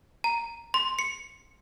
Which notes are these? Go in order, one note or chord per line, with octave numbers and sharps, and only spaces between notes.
A#5
C6
C#7